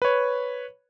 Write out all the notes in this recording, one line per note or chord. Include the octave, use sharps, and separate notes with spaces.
B4 C#5